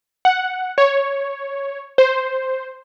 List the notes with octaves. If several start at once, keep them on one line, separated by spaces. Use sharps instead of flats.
F#5
C#5
C5